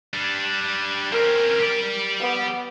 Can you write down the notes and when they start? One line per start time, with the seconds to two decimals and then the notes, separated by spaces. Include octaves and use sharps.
0.13 G3 D4
1.12 C4 C#4 A#4
1.59 G4 D5
2.20 B3